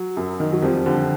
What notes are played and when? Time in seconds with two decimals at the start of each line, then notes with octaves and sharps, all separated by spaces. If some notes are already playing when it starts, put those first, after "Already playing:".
Already playing: F#3
0.17 F#2
0.40 D#3
0.52 F#3
0.62 F2 F3 G3
0.86 D3 F3 G3